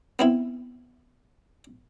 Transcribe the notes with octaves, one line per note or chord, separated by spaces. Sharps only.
B3 C4 E4